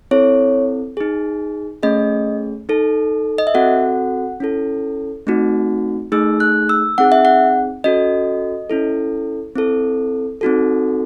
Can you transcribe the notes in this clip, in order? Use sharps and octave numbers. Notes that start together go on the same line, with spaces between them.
C4 E4 A4 C#5
D#4 G#4
A3 C#4 G#4 D#5
D#4 A4
D#5
E5
C4 F#4 A4 F#5
C#4 E4 A4
A3 C4 D#4 F#4
A3 D#4 G#4 E6
F#6
E6
C4 D#4 G#4 F#5
E5
F#5
C#4 F#4 A4 D#5
C#4 E4 A4
C4 E4 A4
C4 D#4 F#4 A4